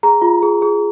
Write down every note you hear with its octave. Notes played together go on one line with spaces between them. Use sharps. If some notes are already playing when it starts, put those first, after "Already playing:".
G#4 A#5
F4
G#4
G#4